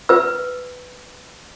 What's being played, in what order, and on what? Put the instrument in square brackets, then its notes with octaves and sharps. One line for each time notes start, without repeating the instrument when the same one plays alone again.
[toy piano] B4 E6